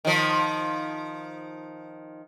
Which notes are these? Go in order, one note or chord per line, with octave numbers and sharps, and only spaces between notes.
D#3 F3